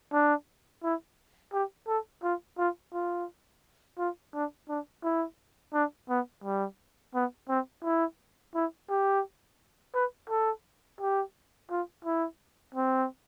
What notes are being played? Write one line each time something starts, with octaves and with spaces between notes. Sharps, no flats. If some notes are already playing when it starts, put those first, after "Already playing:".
D4
E4
G4
A4
F4
F4
F4
F4
D4
D4
E4
D4
B3
G3
B3
C4
E4
E4
G4
B4
A4
G4
F4
E4
C4